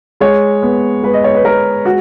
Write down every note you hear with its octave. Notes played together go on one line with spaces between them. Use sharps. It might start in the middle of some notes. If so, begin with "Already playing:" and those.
G#3 C#5
B3
G#3 B4
D#5
C#5
B4
G#3 A#4
G#3 F#4